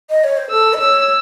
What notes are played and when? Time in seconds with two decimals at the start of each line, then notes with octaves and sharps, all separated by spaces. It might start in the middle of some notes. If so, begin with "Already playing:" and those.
0.10 D#5
0.24 C#5
0.37 C5
0.50 A4 E6
0.73 D#5
0.80 C#5 E6